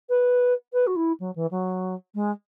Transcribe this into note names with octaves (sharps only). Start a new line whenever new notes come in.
B4
B4
F#4
E4
F#3
E3
F#3
G#3